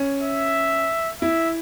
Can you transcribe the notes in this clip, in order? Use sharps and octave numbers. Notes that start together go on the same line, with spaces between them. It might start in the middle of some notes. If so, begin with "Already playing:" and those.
Already playing: C#4
E5
E4 E5